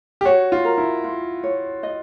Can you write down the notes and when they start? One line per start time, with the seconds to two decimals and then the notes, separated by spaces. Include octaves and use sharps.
0.21 G4
0.25 F#4 C#5
0.52 F4
0.65 A#4
0.78 E4
1.04 F4
1.43 C#5
1.83 D#5